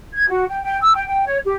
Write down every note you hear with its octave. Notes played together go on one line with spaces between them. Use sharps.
G#6
F#4
G5
G5
E6
G5
G5
C#5
G4